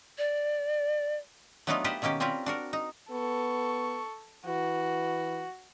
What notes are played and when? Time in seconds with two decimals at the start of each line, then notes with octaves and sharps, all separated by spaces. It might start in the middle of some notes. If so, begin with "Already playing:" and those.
0.18 D5
1.67 F#3 A3 B3 D4 D#4 F4
1.84 F4 G4 B4 C5 D#5
2.02 B2 D#3 A#3 C#4 G4
2.20 G3 C4 C#4 F4 A#4 B4
2.46 D4 F#4 A#4
2.73 D#4
3.11 B3 A4 C#6
4.46 E3 F#4